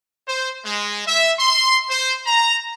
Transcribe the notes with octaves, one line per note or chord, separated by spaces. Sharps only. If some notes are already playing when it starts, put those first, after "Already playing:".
C5
G#3
E5
C6
C5
A#5